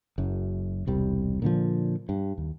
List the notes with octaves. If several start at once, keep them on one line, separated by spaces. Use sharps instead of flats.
F#1 F#2
E1 C2 G3
A#2 D3 E3 F3
G2
D#2